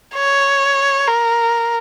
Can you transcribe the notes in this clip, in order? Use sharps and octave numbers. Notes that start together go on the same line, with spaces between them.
C#5
A#4